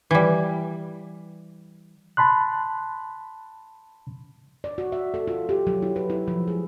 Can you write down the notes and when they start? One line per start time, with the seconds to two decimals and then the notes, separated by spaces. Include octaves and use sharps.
0.11 E3 G3
2.17 A5 B5 C6 F#6
4.64 D5
4.78 F#4
4.92 E5
5.14 A4
5.28 F4
5.49 G4
5.67 F#3
5.82 E4
5.96 B4
6.10 E4
6.28 F3
6.48 G#4